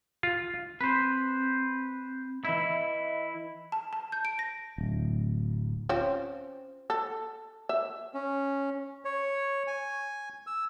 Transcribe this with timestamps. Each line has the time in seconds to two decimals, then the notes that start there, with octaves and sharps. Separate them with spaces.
0.23 F4
0.81 C4 B4 C5
2.45 E3 E4 D#5
3.72 A5
3.93 A5
4.12 G6
4.25 D7
4.39 A#6
4.78 D1
5.89 C4 C#4 F4
6.90 A4
7.69 E5
8.14 C#4
9.05 C#5
9.67 G#5
10.47 E6